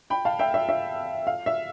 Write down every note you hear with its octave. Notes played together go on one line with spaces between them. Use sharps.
G5 B5
F5 A5
E5 G5
E5
E5
F5
E5